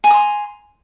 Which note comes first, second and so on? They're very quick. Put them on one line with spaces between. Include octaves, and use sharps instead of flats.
G#5 A#5 D#6 C6